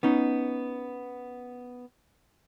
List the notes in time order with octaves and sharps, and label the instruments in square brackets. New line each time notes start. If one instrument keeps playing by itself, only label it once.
[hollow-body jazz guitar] B3 C#4 D#4